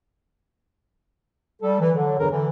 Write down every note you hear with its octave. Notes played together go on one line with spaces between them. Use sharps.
G3 A4
E3
D3 F#3
E2 G2 D3 E3 F#3 A#4
D3 E3